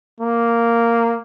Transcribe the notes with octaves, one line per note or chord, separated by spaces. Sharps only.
A#3